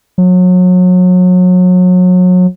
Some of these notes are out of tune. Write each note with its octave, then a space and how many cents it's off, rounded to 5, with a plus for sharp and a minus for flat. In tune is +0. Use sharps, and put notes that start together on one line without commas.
F#3 -30